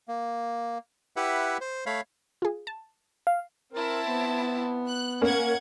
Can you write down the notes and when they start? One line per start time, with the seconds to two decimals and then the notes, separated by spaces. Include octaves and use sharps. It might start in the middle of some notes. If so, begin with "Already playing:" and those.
0.08 A#3
1.16 E4 G4 B4 E5 F#5
1.61 C5
1.86 A3 C#5 F5 B5
2.42 F4 G#4
2.67 A5
3.27 F5
3.73 C4 E4 A#4 A5
4.07 B3
4.89 F#6
5.22 A#3 C#4 F#5 G#6